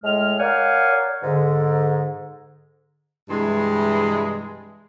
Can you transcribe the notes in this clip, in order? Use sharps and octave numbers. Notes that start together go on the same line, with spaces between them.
A2 G#3 F6
A#4 C#5 D5 F5 F#5 G#5
G#2 D3
G2 C3 E3 G#3